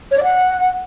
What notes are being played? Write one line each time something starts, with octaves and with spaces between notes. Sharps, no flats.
C#5
D5
F#5